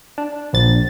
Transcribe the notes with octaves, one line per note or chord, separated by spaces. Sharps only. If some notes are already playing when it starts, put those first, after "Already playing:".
D4
A#1 A6